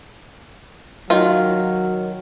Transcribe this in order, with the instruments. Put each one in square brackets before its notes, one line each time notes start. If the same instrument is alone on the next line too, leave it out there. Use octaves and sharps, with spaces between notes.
[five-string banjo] D#3 F4 [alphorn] F#3